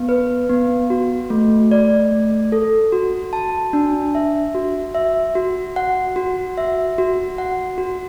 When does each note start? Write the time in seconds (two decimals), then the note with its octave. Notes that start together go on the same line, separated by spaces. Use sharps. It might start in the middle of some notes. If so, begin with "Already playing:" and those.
Already playing: B3
0.09 B4
0.49 B3
0.90 F#4
1.30 A3
1.71 D5
2.11 A3
2.52 A4
2.92 F#4
3.33 A5
3.73 D4
4.15 E5
4.55 F#4
4.95 E5
5.35 F#4
5.76 F#5
6.16 F#4
6.57 E5
6.98 F#4
7.38 F#5
7.78 F#4